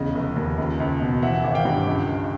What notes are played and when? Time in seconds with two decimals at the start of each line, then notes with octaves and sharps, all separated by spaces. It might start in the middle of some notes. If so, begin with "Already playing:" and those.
Already playing: E2 C#3 D#5
0.15 F1
0.36 D#2
0.57 C#2
0.80 C#2
1.01 B2
1.23 E3 E5 F#5
1.44 G#1
1.54 F5 G5
1.65 G2
1.87 C#2
2.09 C#2